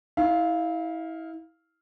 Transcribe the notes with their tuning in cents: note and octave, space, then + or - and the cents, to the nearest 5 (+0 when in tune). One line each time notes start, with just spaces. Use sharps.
E4 -30 F5 +0